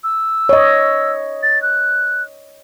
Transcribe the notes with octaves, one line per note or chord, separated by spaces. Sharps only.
E6
C#5 D#5
A6
F#6